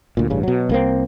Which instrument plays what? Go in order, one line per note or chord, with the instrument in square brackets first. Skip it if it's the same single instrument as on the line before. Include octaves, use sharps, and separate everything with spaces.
[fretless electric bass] D2 A#2
A1 G2 C#3
B2 F#3
C2 A#3 C4